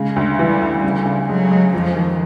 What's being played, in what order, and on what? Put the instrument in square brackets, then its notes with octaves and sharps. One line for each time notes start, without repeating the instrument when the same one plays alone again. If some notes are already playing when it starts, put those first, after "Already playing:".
Already playing: [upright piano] C#3 [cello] G#3
[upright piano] D2
[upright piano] E3 [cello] G3
[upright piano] D2
[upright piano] C#3 [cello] G3
[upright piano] C#3
[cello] F#3 [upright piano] G#3
[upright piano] G#3
[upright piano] F2 [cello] F3
[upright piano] D#3